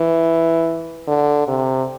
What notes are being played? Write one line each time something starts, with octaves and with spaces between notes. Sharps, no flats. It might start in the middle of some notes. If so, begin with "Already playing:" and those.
Already playing: E3
D3
C3